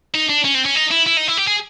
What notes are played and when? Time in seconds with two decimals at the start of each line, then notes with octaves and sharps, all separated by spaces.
0.15 D#4
0.30 D4
0.45 C#4
0.55 C4
0.66 C#4
0.75 D#4
0.92 E4
1.07 E4
1.17 D#4
1.28 E4
1.37 G4
1.47 G#4